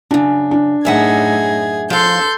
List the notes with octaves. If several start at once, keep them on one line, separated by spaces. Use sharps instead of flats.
F#2 C#3 D4
D4
F#2 A2 D#4 G#4 E5 F#5 G#6
F3 A4 F5 C6 G6